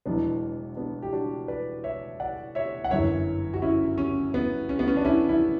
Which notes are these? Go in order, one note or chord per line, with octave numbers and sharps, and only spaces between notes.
E1 E2 B2 F#3 B3 D4
B3 D4
G4
D4 F#4
B4 D5
C#5 E5
D5 F#5
C#5 E5
F#5
G1 F#2 E3 C#5 E5
F#4
C#4 E4
C#4
B3
C#4
B3
C#4
D4
C#4 E4
C#4 E4